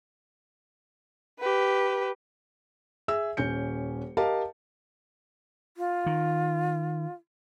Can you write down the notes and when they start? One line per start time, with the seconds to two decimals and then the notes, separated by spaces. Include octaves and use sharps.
1.40 G4 B4
3.08 G#4 E5 E6
3.37 D#1 C#4 G6 C#7
4.17 G4 A#4 D#5 F5 A5
5.77 F4
6.06 D#3